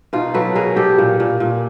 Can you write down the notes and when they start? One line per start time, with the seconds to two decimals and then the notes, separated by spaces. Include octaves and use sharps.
0.13 B2 D#4 F4
0.34 F#3 A4 B4
0.55 B2 G#4 A#4
0.76 B2 G4 A4
0.98 A#2
1.20 A#2
1.40 A#2